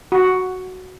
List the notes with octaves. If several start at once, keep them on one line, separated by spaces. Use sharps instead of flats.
F#4